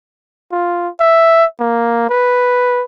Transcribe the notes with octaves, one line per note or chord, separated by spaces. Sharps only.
F4
E5
A#3
B4